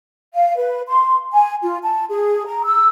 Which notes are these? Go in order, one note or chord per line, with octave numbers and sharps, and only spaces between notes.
F5
B4
C6
G#5
F4
A5
G#4
A#5
E6